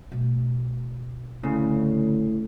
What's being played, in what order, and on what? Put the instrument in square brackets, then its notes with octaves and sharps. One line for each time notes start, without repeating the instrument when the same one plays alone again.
[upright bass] B2 A3
[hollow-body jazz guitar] D2 C#3 [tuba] A2